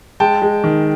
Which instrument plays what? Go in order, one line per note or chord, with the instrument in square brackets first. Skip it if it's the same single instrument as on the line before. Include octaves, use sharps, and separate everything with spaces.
[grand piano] G#3 G5 A5
G#3
D#3